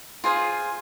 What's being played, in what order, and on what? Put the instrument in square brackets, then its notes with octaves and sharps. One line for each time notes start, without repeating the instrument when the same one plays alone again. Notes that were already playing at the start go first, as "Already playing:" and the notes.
[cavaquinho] F4 G#4 C5